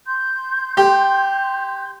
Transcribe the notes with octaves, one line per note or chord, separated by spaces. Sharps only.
C6 G6
G4